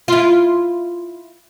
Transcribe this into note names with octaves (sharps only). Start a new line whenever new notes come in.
E4 F4